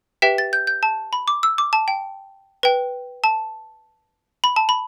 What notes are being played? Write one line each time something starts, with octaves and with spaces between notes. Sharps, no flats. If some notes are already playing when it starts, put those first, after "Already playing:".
G4 B4 E5 G5 B6
A6
G6
G6
A5
B5
D6
E6
D6
A5
G5
B4 G5
A5
B5
A5
B5